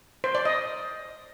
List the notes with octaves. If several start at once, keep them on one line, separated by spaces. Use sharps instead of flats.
C5
D5
D#5